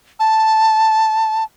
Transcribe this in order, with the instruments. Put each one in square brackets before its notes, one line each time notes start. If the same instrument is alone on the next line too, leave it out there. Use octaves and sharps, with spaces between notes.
[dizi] A5